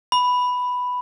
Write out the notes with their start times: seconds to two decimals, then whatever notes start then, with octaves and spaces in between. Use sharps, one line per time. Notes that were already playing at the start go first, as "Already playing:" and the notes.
0.12 B5